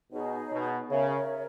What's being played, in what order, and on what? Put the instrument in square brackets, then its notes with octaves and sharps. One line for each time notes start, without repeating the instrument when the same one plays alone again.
[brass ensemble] B2 [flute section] D#4 G#4 C#5
[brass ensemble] B2
[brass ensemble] C#3 [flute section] A#4 C#5 E5